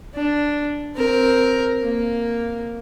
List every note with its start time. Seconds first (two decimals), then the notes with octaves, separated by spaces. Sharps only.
0.14 D4
0.96 C4 A#4
1.83 A#3